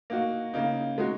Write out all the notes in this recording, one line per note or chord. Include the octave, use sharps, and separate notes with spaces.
A#3 D#4 F#4
C#3 A#3 D#4
G#3 D#4 F#4